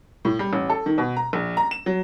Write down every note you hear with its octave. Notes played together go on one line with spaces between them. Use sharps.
A2
G3
A1
A4
D#3
B2
A#5
A#1
A#5
E7
F#3